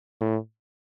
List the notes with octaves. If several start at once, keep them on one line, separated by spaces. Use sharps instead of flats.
A2